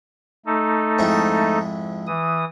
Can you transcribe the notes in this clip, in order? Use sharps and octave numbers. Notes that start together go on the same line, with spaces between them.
A3 D#4 A4
F2 G#2 E4
E3 D#6